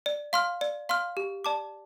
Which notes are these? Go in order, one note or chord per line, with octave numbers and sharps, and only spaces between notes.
D5
F5 C6 F6
D5
F5 C6 F6
G4
D5 A5 D6